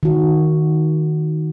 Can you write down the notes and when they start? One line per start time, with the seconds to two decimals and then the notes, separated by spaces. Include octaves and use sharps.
0.03 D#3 F#4